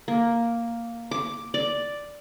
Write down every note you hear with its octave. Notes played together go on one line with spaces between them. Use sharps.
A#3
D6
D5